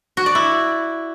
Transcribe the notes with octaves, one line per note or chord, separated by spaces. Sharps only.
F#4
D5
E4